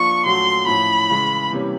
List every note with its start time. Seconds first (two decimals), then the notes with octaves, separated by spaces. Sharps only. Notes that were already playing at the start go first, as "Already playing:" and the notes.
Already playing: F3 A#3 D4 F4 C#6
0.25 A#2 F#3 A3 C#4 F#4 C6
0.67 A2 F3 A3 C#4 B5
1.10 C#3 E3 G#3
1.50 C3 E3 G3 A#3 C#4